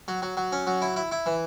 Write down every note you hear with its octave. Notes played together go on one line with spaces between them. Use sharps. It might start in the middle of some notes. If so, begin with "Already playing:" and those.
F#3
F#3
F#3
C#4
F#3
E4
E4
E4
E3